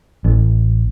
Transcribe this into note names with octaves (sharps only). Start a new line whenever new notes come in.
A1